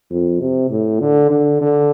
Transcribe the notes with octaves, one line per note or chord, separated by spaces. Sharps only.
F2
C3
A2
D3
D3
D3